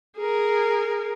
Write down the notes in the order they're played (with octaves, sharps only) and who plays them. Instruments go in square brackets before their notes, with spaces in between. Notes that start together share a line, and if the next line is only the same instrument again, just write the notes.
[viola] G#4 A#4